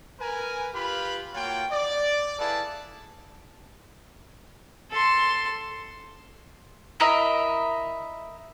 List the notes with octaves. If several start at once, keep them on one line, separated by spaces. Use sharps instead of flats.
A#4 B4 G#5
F4 G4 B4 F5 B5
A#3 F4 F#4 C#5 F#5 G5
D5
E4 G#4 A4 B4 F5 A5
A4 C6
E4 A#4 D#5 E5